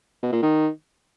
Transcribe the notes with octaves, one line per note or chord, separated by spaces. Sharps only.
B2
A#2
D#3